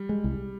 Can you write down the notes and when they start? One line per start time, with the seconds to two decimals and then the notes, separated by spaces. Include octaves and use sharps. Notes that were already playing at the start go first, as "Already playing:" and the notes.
Already playing: G3
0.09 G#3
0.24 C2